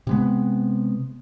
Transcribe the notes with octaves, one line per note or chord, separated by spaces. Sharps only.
C3 G#3 B3